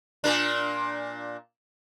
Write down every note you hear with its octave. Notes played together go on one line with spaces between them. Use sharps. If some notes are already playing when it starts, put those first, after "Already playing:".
A#2 A#3 D4